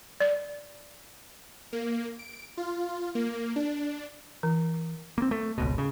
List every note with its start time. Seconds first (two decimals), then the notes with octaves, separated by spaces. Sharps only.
0.20 D5
1.73 A#3
2.19 D7
2.57 F4
3.15 A#3
3.56 D4
4.43 E3
5.18 A#3 C4
5.31 A3
5.58 G#1 C#2 B2
5.78 C#3